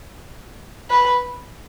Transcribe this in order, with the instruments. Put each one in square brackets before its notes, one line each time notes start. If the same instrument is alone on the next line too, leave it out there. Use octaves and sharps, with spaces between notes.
[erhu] B4